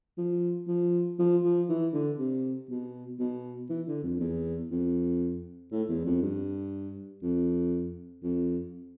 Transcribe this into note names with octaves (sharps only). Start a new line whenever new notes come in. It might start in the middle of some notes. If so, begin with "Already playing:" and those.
F3
F3
F3
F3
E3
D3
C3
B2
B2
E3
D3
F2
E2
F2
A2
E2
F2
G2
F2
F2